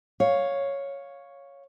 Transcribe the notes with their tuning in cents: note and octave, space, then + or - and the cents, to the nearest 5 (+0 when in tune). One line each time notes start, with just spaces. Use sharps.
C#5 +0 F5 +10